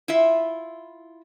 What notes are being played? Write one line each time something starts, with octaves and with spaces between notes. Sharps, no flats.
E4 F4 E5